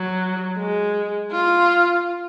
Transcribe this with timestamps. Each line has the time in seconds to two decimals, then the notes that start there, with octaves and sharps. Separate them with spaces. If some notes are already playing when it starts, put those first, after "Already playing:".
Already playing: F#3
0.58 G#3
1.32 F4